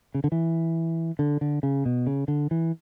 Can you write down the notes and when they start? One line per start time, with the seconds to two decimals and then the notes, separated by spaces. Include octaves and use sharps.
0.14 C#3
0.24 D3
0.32 E3
1.19 D3
1.41 D3
1.63 C#3
1.86 B2
2.07 C#3
2.28 D3
2.51 E3